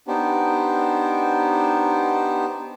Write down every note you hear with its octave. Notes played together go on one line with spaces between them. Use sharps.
B3 D4 D#4 G4 C5